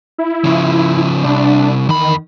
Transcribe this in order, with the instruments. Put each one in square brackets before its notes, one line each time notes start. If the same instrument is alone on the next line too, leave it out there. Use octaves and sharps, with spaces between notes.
[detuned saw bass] E4
[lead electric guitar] C#3 F3
[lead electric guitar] C2 [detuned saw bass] D4
[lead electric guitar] E2 B5 [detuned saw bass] D#3